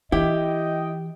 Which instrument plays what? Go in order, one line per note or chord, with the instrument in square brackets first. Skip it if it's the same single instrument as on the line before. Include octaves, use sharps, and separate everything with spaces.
[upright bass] E3 [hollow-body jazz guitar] E4 [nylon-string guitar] G4 [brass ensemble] D#5 G5